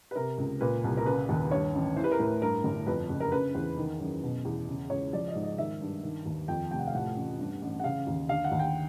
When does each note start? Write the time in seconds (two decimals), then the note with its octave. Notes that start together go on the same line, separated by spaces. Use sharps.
0.11 B4
0.15 C3 A#4
0.38 C#2
0.61 A#2 B4
0.84 C2
0.97 A#4
1.06 C#3 B4
1.29 D#2
1.51 G2 C#5
1.74 A1
1.96 E3 C5
2.04 B4
2.11 A#4
2.19 A2 B4
2.41 G2 A#4
2.64 G1
2.87 F2 B4
3.09 F#1
3.20 A#4
3.32 C#3 B4
3.55 E2 C5
3.78 D#3
4.00 F#2
4.22 B2
4.45 E2
4.68 C#3
4.90 C#2 C#5
5.13 F3 D5
5.28 D#5
5.35 G#2
5.43 D#5
5.58 D#3 E5
5.81 G2
6.03 D#3
6.26 D#2
6.48 F2 G5
6.71 F1 G5
6.79 F#5
6.87 F5
6.94 A2 F#5
7.16 A1
7.39 G2
7.61 A1
7.80 F#5
7.84 C#3 F5
8.07 D#2
8.29 D3 F5
8.44 F#5
8.51 D#2
8.59 G5